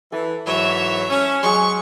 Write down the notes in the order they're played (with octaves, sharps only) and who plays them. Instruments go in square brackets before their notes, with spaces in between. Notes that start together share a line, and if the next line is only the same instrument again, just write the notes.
[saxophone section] E3 [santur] A4
[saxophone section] G#2 E3 F#3 [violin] C#5 E5
[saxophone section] C#4
[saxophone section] F#3 [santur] G#3 G#4 [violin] C#6